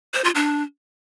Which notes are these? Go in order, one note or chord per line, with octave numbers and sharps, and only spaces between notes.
C5
F4
D4